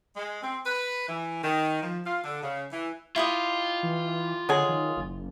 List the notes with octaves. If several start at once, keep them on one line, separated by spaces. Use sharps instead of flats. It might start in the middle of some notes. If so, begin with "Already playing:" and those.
G#3
C4
B4
E3
D#3
F3
F4
D3
C#3
E3
E4 F4 G4 D#5
E3
D3 F#3 G#3 G#4
D#3
F#1